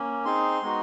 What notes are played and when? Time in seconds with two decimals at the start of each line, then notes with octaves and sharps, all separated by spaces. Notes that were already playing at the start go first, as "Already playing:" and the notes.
Already playing: A#3 C#4
0.25 C4 D#4 G#4 C6
0.62 G#3 B3 D#4 F#4